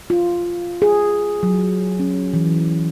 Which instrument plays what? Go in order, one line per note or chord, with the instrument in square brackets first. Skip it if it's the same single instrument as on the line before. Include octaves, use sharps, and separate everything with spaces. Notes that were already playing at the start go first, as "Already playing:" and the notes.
[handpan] F4
G#4
F#3
C#4
E3